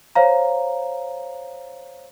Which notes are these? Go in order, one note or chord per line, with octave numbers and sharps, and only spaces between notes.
C5 C#5 F5 A#5